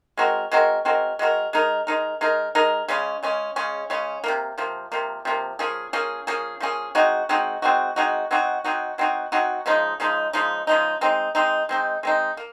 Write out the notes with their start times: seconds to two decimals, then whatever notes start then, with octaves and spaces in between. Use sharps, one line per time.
0.17 G#3 C4 F#4 A#4
0.52 G#3 C4 F#4 A#4
0.85 G#3 C4 F#4 A#4
1.19 G#3 C4 F#4 A#4
1.53 G#3 D#4 A#4
1.87 G#3 D#4 A#4
2.21 G#3 D#4 A#4
2.55 G#3 D#4 A#4
2.88 C#3 G#3 C#4
3.23 C#3 G#3 C#4
3.56 C#3 G#3 C#4
3.90 C#3 G#3 C#4
4.24 C3 F3 A#3
4.58 C3 F3 A#3
4.92 C3 F3 A#3
5.25 C3 F3 A#3
5.59 F3 A#3 C#4 G#4
5.93 F3 A#3 C#4 G#4
6.27 F3 A#3 C#4 G#4
6.60 F3 A#3 C#4 G#4
6.95 G#3 C4 D#4 F#4
7.29 G#3 C4 D#4 F#4
7.62 G#3 C4 D#4 F#4
7.96 G#3 C4 D#4 F#4
8.31 F#3 C4 D#4 F#4
8.64 F#3 C4 D#4 F#4
8.98 F#3 C4 D#4 F#4
9.32 F#3 C4 D#4 F#4
9.66 C#3 F3 G#3 D#4
10.00 C#3 F3 G#3 D#4
10.33 C#3 F3 G#3 D#4
10.67 C#3 F3 G#3 D#4
11.01 G#3 C4 D#4
11.35 G#3 C4 D#4
11.69 G#3 C4 D#4
12.03 G#3 C4 D#4
12.37 A#3